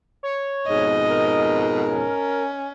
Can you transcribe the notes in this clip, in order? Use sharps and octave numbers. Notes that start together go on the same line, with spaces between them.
C#5
F2 G#2 B2 D#5
A#4
C#4